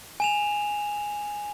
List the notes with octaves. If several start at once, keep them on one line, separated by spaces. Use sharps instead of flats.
G#5 E7 F7